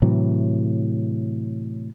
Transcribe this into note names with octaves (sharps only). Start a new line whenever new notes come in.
A2 C3 E3 F#3